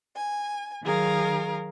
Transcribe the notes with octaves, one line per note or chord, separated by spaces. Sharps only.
G#5
D#3 F#3 G#4 A#4 F5